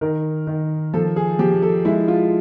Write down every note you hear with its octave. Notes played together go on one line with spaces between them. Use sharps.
D#3 A#4
D#3
F3 A4
G#4
F3 G4
A4
G#3 E4
F4